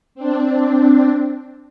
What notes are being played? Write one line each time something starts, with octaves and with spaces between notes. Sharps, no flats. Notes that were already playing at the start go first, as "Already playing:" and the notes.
C4 D4